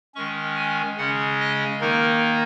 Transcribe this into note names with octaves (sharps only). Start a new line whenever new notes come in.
D#3 G#3 C#4 C#6
G#5
C#3 G#3 C#4 F#5
D#5
D#3 A#3 D#4 A#4